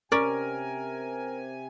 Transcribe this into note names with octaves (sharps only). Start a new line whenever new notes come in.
C3 C#4 A#4 D5 G#5